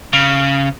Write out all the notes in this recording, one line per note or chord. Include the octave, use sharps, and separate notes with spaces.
C#3